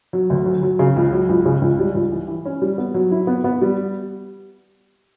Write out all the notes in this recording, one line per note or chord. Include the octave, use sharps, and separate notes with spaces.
F#3
D2
F#3
F#3
C#3
C#2
F#3
C#2
C#3
C#2
G3
C#2
E3
E3
C#4
G3
B3
F#3
E4
B3
B3
G3